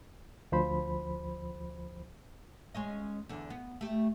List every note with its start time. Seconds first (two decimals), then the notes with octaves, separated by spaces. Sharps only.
0.52 D2 F3 C5 B5
2.74 G#3 C#4 D#5
3.29 E2 D3
3.50 B3
3.81 A3 G4